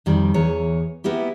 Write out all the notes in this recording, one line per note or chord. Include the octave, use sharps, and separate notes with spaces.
F2 D#3 G3
E2 E3 G#4 C#5 A#5
A#3 B3 E4 G4